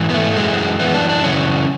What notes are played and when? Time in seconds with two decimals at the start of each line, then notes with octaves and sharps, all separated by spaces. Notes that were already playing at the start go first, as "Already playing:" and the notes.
Already playing: G#2 E3
0.10 B3
0.14 A3
0.36 F#2 E3 G#3
0.79 F#2 E3 B3
0.94 D4
1.09 D4
1.23 F#2 C#3 E3 C#4